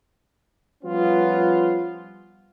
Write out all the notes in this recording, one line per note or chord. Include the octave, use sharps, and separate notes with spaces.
F3 G3 B3 C#4 F4